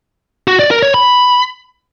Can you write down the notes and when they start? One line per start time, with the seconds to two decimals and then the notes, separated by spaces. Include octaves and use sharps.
0.48 F#4
0.59 D5
0.71 A#4
0.83 C#5
0.94 B5